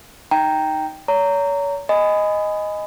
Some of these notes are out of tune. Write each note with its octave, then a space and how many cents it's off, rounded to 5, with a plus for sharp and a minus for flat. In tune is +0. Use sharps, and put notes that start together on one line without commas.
D#4 +0 G5 +0 A#5 -5
C#5 +35 A#5 -15
D#5 +0 G#5 +0 B5 +25